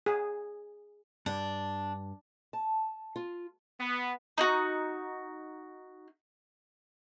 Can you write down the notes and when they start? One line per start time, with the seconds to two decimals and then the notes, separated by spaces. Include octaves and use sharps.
0.06 G#4
1.26 G2 D4
2.53 A5
3.16 F4
3.80 B3
4.38 D#4 E4 F#4